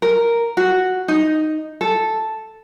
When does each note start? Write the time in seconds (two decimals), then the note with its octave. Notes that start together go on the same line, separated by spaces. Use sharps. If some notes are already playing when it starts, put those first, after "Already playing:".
0.02 A#4
0.57 F#4
1.08 D#4
1.81 A4